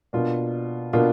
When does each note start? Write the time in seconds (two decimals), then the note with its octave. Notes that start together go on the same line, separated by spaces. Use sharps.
0.13 B2 A#3 D4 F4
0.93 B2 A#3 D4 F4